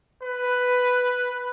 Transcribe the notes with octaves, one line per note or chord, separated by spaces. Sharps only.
B4